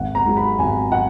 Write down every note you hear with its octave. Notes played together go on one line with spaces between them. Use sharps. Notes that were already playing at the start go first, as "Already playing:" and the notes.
Already playing: G#1 F#5
A#5
G#2 F#3
B5
G#1 G#5
F#3 F#5